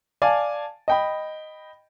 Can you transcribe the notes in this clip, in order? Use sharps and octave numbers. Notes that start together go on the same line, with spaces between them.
D5 F5 G#5 A5
D#5 G5 B5